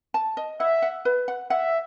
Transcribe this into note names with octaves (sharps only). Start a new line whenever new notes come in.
A5
D#5
E5 F#5
F#5
B4
F#5
E5 F#5